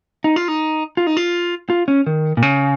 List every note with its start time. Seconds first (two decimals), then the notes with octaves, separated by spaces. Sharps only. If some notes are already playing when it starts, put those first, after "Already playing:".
0.24 D#4
0.36 F4
0.48 D#4
0.97 F4
1.07 D#4
1.17 F4
1.70 F4
1.88 C#4
2.06 D#3
2.37 A#2
2.42 C#3